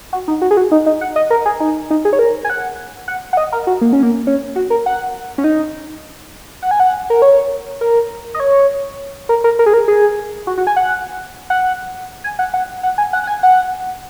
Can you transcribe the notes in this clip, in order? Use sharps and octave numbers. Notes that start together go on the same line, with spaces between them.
F#4
D#4
F#4
G#4
F#4
D#4
D#4
F#5
D#5
A#4
G#4
D#4
D#4
G#4
C#5
A#4
G#5
F#5
F#5
F#5
D#5
A#4
F#4
A#3
C#4
A#3
C#4
F#4
A#4
F#5
C#4
D#4
F#5
G#5
F#5
A#4
C#5
A#4
D#5
C#5
A#4
A#4
A#4
G#4
A#4
G#4
F#4
F#4
G#5
F#5
F#5
G#5
F#5
F#5
F#5
G#5
F#5
F#5
G#5
F#5